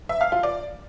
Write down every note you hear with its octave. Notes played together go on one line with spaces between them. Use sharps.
E5
F5
F4
D5